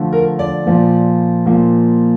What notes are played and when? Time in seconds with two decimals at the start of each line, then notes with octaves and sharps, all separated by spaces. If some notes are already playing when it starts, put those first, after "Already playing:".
Already playing: D3 F3 A3
0.13 A#4
0.39 D5
0.66 A#2 F3 A#3
1.46 A#2 F3 A#3